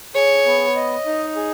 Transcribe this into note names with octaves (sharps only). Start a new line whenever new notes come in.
G#4 C#5
B3
D#5
D#4
G#4